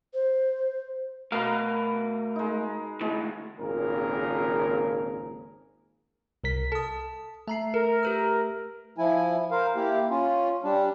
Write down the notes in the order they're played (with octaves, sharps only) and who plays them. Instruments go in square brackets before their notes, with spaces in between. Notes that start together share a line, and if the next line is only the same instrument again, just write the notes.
[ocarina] C5
[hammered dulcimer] B2 B4 A#5 [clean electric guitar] A3 A#4 F5
[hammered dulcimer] G#3 D#4
[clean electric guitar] D2 A2 E3 [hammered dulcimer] G#3
[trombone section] G#1 F2 A#2 C#3 G#4 A#4
[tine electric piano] C2 A#4 B6
[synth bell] A4 D#6 [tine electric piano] A5
[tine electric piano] A3 E5 [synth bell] A5 A#5 C7
[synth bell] A4 [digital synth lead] A#4
[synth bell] G4 B4 E6
[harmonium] F3 E4 G#5
A#4 C5 F5
A#3 E4 G4
C#4 F4
G3 D4